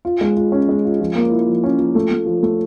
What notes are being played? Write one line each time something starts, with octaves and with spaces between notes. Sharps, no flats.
F4
G#3
F4
C#4
G#3
F4
F3
A#3
E4
F3
C#4
F3
A3
A3
F3
A3